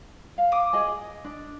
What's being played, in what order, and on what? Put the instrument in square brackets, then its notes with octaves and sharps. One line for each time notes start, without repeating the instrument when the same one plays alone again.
[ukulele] F5
[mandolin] D6 D#6
[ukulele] G#4 D#5 G#5
D4